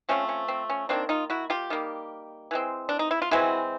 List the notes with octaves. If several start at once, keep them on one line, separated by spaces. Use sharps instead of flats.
F3 A3 C4 C#4
C#4
C4
C#4
D#3 G3 A#3 C4 D4
D#4 F4
E4 F#4
F4 G4
D#3 G3 A#3
E3 G#3 C4
D4
D#4
E4
F4
E3 G#3 C4 E4 F#4